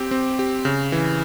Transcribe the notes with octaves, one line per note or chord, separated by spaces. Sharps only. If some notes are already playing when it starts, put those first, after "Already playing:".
Already playing: C4 G4
C4
G4
C#3
E3